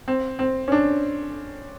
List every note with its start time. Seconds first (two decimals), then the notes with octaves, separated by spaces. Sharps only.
0.08 C4
0.39 C4
0.68 C#4
0.72 D4